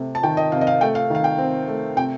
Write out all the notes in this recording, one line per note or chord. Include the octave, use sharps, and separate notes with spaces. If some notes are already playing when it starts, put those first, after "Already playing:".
Already playing: C3 A3
A5
D#3 G5
D#5
C3 F5
D#5
F5
A3 G5
F5
D#3 F5
G5
C4
A3
C3 G5